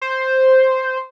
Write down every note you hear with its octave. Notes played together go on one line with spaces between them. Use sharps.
C5